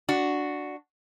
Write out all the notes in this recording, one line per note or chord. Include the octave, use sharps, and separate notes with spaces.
D4 F#4